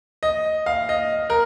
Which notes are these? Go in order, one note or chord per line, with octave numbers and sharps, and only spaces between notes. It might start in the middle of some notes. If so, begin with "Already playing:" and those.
D#5
F5
D#5
A#4